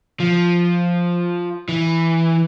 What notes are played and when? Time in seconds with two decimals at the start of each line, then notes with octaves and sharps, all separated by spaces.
0.20 F3
1.68 E3